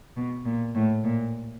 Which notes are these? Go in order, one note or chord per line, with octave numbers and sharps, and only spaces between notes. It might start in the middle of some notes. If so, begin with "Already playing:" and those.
B2
A#2
A2
A#2